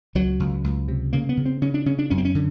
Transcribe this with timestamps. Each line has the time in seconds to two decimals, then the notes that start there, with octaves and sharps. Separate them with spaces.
0.15 C#2 F#3
0.40 C#2
0.64 C#2
0.88 C3
1.13 C#3 A#3
1.29 B3
1.37 C#3
1.46 C4
1.62 C#3 C#4
1.74 D4
1.86 C#3 C#4
1.99 D4
2.10 F#2 C#4
2.18 C4
2.25 C#4
2.35 D3